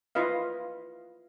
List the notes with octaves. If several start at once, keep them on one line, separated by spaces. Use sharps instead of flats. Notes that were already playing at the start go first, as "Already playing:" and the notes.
E4 F4 B4 D#5 F5